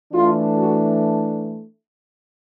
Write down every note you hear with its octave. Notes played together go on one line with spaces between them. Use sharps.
E3 A3 D4 F4
F#4